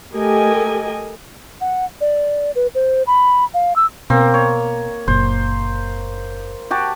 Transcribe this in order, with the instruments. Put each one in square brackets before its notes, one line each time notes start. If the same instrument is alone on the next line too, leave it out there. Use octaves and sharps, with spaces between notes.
[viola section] A3 G4 A4 A#4 D#5 G#5
[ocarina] F#5
D5
B4
C5
B5
F5
E6
[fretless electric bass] B2 [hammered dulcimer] A#3 C4
[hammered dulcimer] C#5
[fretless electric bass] F#1 A#2 [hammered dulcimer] C5
[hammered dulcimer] F#4 G4 A5